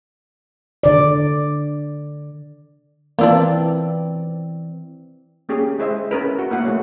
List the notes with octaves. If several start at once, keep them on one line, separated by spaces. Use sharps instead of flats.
D3 D5
E3 A#3 C4 D4 E4 F4 D5
A#3 C#4 G4 G#4
G#3 E4 G#4 C5 D#5 E5
C#4 A#4 B4
F#4
A#3 E4 F#5
G#3 A3 C#5